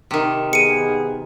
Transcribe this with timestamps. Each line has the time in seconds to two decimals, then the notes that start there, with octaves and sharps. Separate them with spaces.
0.11 C3 D#3
0.53 B3 G#4 C#7 D#7